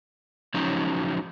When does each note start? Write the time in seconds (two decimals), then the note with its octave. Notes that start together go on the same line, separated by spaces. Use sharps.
0.54 F3 F#3 G#3 C#4 D#4